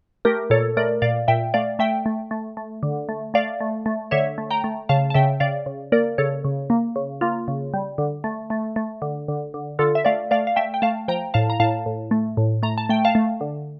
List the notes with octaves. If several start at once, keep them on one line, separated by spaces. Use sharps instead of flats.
A3 G4 A#4
A#2 A4 C#5
A3 A#4 D5
A#2 D5 F5
A#2 E5 G5
A3 D5 F5
A3 E5 G5
A3
A3
A3
D3
A3
A3 D5 F5
A3
A3
D3 C#5 E5
A3
G5 A#5
A3
C#3 F5 A5
A5
C#3 E5 G5
C#3 D5 F5
C#3
A#3 A#4 D5
C#3 A4 C#5
C#3
A#3
C#3
A#3 F4
C#3
G3
D3
A3
A3
A3
D3
D3
D3
D3 F4 A4
E5
A3 D5 F5
A3 D5 F5
F5
A3 E5 G5
G5
A3 F5 A5
F3 G5 A#5
A2 F5 A5
A#5
A2 F5 A5
A2
A3
A2
A3 A#5
A5
A3 G5
F5 A5
A3
D3